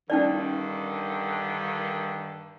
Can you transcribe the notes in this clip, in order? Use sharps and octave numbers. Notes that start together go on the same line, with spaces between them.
G2 D3 D#3 C#4 D#4 D5